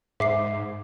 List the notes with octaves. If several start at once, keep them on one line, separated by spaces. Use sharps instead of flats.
G#2 E5 D6 C7